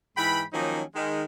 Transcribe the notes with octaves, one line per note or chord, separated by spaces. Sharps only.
G#2 E3 G5 B5
D#3 F3 F#3 A#3 C#4 D#4
D#3 G#3